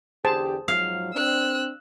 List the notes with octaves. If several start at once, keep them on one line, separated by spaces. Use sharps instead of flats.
E2 D3 G4 G#4 C5 A5
G#2 F3 F#3 F5
C4 D4 E6 F#6